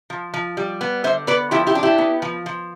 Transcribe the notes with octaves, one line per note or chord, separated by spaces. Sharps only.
F3
F3
G3
B3
D3 C5 E5
B3 B4 D5
F3 E4 G4
E4 G4
D4
E4 G4
B3
F3
F3